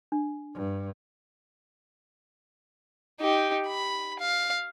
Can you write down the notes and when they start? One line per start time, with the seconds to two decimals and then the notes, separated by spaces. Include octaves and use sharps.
0.12 D4
0.54 G2
3.20 D#4 G4
3.68 B5
4.19 F5